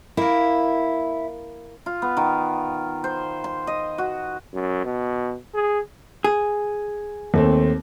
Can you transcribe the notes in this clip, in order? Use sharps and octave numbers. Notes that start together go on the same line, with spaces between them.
A#3 E4 A#4
F4
B3
D#3
C5
C6
D#5
F#4
F#2
B2
G#4
G#4
D#2 A3 C4